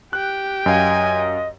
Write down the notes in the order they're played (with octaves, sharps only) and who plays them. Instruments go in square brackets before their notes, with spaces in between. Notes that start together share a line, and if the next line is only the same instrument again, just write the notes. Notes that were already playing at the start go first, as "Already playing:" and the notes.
[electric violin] G4 G5 [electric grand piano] F#6
[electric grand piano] F#2 F5 [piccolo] D#5 [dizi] G#5